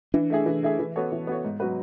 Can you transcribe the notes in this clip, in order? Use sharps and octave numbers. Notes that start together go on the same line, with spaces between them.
E3 D4
A3 E4 G#4
E3
A3 E4 G#4
E3
B3 F#4 A4 C#5
E3
B3 F#4 A4 C#5
G#2
F#3 B3 F#4 B4